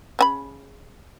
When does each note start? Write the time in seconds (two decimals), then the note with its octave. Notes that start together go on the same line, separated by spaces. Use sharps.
0.19 C#3 G#5 B5